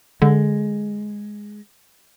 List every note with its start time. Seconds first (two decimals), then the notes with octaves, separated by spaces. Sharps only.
0.22 D3 G#3